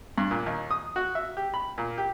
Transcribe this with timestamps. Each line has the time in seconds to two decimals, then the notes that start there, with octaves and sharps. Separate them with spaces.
0.18 G2
0.31 A#2
0.46 D#2
0.71 D#6
0.96 F#4
1.15 E5
1.37 G4
1.54 B5
1.78 A#2
1.98 G4